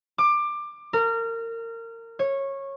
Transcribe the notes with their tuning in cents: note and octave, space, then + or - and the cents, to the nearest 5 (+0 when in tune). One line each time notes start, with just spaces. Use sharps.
D6 +20
A#4 -25
C#5 -15